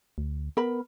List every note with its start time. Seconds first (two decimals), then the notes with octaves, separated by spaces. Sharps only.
0.18 D2
0.57 B3 A#4 B5